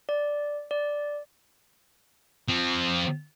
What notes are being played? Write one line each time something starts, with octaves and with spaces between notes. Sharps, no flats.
D5
D5
F3 C4